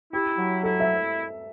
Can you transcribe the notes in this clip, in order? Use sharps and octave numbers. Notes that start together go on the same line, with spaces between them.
E4 G4
F#3
E4 A4
E5